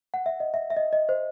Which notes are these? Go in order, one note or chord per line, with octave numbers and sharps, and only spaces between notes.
F#5
E5
D#5
E5
E5
D#5
D#5
C5